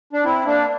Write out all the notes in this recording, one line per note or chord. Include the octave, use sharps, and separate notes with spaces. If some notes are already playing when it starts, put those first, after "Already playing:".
D4
C4 E4
A#3 D4